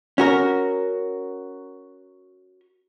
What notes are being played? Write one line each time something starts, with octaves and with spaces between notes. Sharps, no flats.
C#4 F#4 A#4